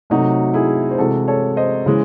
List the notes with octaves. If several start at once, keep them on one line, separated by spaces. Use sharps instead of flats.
C3 F#3 A3 D#4 F#4
E4 G#4
C5
C3 E3 G#3 F#4 A4
A4 C#5
C5 D#5
C#3 E3 G#3